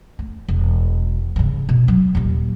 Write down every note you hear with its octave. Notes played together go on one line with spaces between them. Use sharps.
A3
E1
G2 C#3
B2
F#3
D#2 A#2